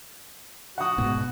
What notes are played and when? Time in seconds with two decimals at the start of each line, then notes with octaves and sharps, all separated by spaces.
0.78 F#4 F#5 D#6
0.98 G#2 B2